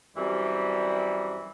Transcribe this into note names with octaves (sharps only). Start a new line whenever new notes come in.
F#2 E3 G3 C4